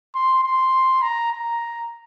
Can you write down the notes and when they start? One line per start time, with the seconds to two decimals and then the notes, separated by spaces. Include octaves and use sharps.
0.15 C6
0.44 C6
1.02 A#5
1.32 A#5